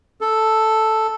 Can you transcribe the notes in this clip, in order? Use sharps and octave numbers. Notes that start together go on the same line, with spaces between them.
A4